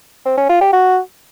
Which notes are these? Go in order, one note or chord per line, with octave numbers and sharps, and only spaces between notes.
C4
C#4
F4
G4
F#4